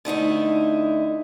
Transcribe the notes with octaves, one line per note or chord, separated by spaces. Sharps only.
D3 A3 D#4 E4